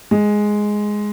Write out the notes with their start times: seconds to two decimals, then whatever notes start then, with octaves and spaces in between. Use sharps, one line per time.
0.11 G#3